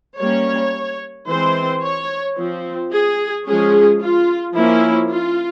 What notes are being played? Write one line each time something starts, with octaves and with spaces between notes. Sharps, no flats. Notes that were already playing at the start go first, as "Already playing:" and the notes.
G3 A#3 C#4 C#5
E3 G#3 C4 C5
C#5
F3 C4
G#4
F3 G#3 C#4 G#4
F4
F3 A#3 C#4 E4
F4